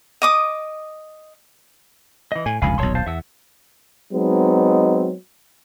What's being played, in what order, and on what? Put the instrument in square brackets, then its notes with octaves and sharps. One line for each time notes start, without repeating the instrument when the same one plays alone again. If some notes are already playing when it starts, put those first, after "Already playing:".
[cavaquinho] D#5 D6 D#6
[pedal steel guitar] E3 D#5
[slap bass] A2 [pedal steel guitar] G#5
[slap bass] F1 C#2 G2 [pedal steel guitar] F5 G#5 B5
[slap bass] D#1 B1 [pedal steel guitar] C#5 A5 C6
[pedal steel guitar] C5 F5 A5
[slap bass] E2 [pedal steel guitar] E5 F#5 E6
[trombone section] F#3 G#3 B3 C4 D#4